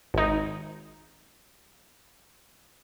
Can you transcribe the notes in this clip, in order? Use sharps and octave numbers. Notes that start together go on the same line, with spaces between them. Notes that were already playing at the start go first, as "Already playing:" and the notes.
G#1 D#4